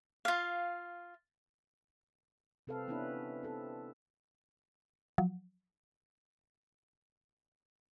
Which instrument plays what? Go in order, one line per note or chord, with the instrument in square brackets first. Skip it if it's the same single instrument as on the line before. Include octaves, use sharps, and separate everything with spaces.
[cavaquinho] F4 F5
[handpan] C3 C4 A4 B4 F5
B3 C#4 D4 E4 B4
C4 A4
[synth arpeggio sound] F3 F#3